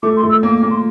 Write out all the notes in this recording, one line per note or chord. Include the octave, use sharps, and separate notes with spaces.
A3 D6
C6
A3
E6
A#3 D6
D6
A#3
C6